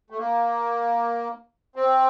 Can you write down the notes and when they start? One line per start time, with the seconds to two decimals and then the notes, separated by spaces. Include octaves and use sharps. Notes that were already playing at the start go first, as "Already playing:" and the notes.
0.10 A3
0.18 A#3
1.76 C4